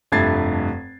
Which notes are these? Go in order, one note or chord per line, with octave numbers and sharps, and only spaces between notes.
F1 G2 A3 G#6 A6 C7